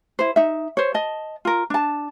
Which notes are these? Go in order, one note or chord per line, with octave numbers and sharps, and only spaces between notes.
E4 C5
D#4 E5
C5 C#5
D#5 A5
F4 A#4
D4 A5